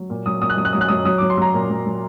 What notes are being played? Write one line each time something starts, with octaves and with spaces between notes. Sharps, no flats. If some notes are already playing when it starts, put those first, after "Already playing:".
Already playing: F#3
A#2
F#3 D#6
A#2 D#6
F#6
F#3 D#6
F#6
F#3 D#6
F#6
F#3 D#6
F#3 D#6
D6
F#3
C6
F#3 A#5
A#2
F#3
F#3